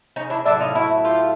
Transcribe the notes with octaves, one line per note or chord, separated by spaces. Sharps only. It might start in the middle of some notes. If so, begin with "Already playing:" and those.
C#4 D#4
D4 E4
A2 F#3 A3 D4 E4
D#4 F4
E4 F#4
F4 G4